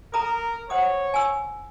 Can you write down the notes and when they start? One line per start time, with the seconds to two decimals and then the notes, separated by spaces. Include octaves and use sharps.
0.14 A4 A#4 A#5 D#6
0.70 C5 C#5 F#5 D#6
1.14 G#5 E6